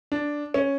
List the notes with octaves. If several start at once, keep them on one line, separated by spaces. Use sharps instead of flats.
D4
C#4